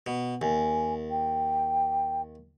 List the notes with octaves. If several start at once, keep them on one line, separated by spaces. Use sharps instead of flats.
B2
D#2 G#5
G5